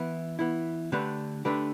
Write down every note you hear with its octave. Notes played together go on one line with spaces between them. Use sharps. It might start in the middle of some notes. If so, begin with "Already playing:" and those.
Already playing: E3 B3 E4
E3 B3 E4
D3 A3 D4 G4 B4
D3 A3 D4 G4 B4